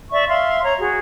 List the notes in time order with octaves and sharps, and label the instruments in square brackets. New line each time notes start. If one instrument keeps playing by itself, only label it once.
[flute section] D5 E5 C#6
E5 F5 C6
C#5 A#5
F#4 G#4